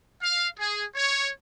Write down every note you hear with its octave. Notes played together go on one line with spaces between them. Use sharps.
F5
G#4
C#5